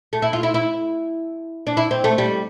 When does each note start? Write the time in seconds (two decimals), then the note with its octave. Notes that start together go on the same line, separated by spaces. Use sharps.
0.13 A3
0.22 E4
0.33 F4
0.43 E4
0.54 E4
1.67 D4
1.77 E4
1.91 C4
2.04 A3
2.18 G3